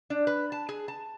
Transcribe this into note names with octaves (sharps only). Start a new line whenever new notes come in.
D4
B4
A5
G#4
A5